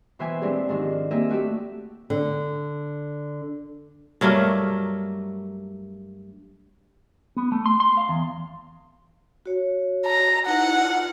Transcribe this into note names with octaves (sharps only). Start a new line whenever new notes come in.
B2 E3 C5 E5 G5 G#5
G#3 C4 D4 E4 G4 G#4
G#2 D#3 F3 D4 D#4
A#3 C4 G4 G#4 D#5 E5
A3 F#4 G4 D5 E5
D3
G2 F#3 A3 A#3
B3
A3
C6
C6
F5
E2
F#4 C#5
A#5
D#4 E4 B4 F#5
F4